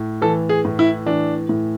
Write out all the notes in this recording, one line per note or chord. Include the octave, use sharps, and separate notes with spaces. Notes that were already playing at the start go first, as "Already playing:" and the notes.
Already playing: A2
E3 A4
G#4
A2
E4
E3 D4
A2